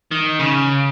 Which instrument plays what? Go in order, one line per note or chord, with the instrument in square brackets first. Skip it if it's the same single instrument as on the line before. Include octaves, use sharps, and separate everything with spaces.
[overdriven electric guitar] D#3
C#3